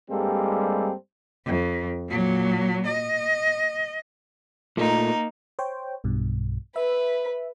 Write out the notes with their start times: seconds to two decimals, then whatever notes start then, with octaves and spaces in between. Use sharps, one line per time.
0.10 G2 G3 G#3 A#3 C4 A4
1.46 F2
2.09 A#2 F#3
2.87 D#5
4.77 A#2 A3 A#3 D#4
5.59 C5 C#5 G5
6.04 B1 G2 B2
6.76 B4 E5